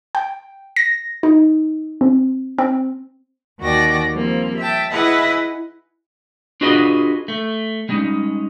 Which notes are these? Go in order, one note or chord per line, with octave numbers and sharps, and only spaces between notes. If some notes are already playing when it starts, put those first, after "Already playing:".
G5
A#6
D#4
C4
C4
D#2 D#3 F#4 D5 G5 A#6
F3 G3 A#3 C4
E5 G5 A5
E4 G#4 B4 D#5 E5 F#5
D4 F4 F#4 G#4 B4 D#5
A3
G3 G#3 C#4 D#4